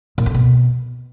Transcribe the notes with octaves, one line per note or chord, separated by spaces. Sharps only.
A#2
D3
B2